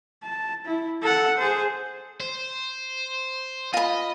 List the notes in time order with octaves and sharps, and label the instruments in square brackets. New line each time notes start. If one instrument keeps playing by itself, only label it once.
[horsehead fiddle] A5
E4
A4 F#5
G#4 C5
[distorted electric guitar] C5
[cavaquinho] F4 B5 [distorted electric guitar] D#5